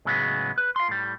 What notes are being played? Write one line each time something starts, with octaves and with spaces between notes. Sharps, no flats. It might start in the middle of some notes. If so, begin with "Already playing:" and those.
A2 C#3 F#3 G#3 B3
B4
F5 C6
A2 G3